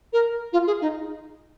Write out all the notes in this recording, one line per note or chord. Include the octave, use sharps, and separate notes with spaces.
A#4
F4
G#4
D#4